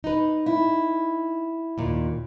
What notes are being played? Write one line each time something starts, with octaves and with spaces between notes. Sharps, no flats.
D#4 B4
E4
D#2 A#2